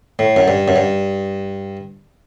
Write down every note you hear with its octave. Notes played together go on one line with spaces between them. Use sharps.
A2
F#2
G2
F#2
G2